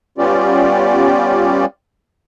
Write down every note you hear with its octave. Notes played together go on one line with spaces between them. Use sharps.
G3 B3 C#4 F4 G4 D5